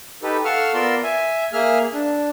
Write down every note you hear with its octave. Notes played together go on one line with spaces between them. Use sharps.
D#4 G4 A4 B4
A4 F5 F#5 C#6 E6 F6
B3 F4 A#4 D5 C6 E6
E5 G#5
A#3 G#4 E5 F6
D4